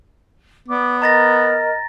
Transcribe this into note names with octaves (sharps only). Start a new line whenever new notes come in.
B3 D5 D6
A#4 D#5 A#5 A6 A#6